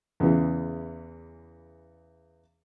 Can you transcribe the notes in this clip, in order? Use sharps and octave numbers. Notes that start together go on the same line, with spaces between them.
E2 C#3 E3